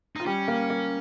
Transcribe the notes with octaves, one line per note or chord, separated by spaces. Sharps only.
D#4 F4
G3 C#4 G4
A#3
A#3